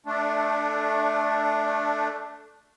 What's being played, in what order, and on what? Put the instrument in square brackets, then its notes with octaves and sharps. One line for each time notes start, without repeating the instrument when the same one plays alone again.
[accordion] A3 D4